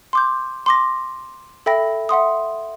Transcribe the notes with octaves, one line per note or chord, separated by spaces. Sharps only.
C6 D6 G6
C6 D6 A#6
A4 E5 G5 B5 A#6
E5 F#5 C6 D#6